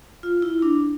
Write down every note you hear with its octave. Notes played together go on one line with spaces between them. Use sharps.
F4
E4
D4